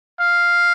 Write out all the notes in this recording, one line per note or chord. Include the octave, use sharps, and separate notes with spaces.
F5